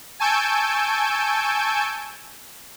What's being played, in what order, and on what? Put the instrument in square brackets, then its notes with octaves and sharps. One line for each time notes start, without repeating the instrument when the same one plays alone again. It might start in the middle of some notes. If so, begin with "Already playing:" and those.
[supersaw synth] G#5 A5 C#6 E6 G6 D7